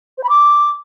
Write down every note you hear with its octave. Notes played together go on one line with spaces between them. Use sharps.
C5
B5
D6